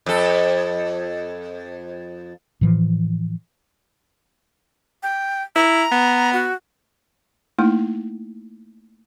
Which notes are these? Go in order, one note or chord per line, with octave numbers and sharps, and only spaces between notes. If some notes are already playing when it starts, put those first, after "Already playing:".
F2 A4
A2 E3 F3
G5
E4 A#5
B3
F#4
A3 A#3 D#4 E4